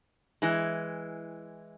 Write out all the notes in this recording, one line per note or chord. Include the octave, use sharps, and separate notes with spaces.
E3 G#3